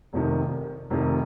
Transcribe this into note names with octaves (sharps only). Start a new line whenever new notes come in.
F1 F2 C3 D#3
F1 F2 C3 D#3